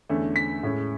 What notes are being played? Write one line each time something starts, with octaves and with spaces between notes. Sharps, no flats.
E2 D3 A3 C#4
B6
A2 G#3 C#4